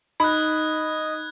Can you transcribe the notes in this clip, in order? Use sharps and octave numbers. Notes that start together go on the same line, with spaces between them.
D#4 D#5 B5 F#6 G#6